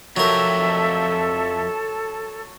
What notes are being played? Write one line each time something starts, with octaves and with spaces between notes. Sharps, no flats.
F2 F#3 G4 A4 A#4 E5